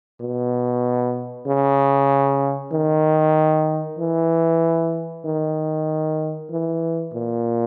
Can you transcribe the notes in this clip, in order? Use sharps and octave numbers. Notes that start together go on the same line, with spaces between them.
B2
C#3
D#3
E3
D#3
E3
A#2